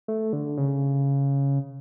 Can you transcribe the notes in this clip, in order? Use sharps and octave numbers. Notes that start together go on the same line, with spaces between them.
A3
D3
C#3